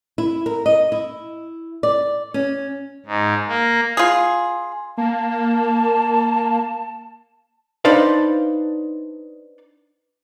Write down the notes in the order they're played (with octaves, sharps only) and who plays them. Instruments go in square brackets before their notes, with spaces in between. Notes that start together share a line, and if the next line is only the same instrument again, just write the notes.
[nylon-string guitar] E4
A#4
D#5
E4
D5
C#4
[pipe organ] G#2
A#3
[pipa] F4 G#4
[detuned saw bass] A#3 [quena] A5
[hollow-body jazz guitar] D4 D#4 B4 C5 D5 F5